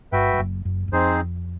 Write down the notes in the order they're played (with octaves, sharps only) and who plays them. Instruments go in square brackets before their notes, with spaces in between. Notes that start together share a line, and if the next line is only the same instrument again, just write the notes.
[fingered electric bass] G1 G2 [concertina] F#4 B4 E5 G5
[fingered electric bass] G2
F#1 F#2
F#1 F#2
F#2
[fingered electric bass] F2 [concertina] C4 D#4 G#4 C5